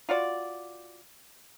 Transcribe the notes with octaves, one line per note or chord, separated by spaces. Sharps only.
F4 F#4 D5